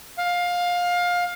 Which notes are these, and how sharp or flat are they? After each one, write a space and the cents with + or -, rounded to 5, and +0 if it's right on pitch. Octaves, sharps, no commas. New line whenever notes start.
F5 +20